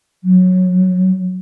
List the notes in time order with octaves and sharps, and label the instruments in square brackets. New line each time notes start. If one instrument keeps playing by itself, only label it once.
[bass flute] F#3